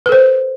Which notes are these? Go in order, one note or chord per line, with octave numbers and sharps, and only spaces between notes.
A4 B4 C5